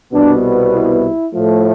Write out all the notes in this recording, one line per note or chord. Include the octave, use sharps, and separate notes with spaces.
C2 B2 B3 D4
E4
A2 F3 A3